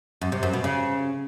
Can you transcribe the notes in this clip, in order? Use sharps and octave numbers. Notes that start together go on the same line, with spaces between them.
F#2
C3
F#2
B2
C#3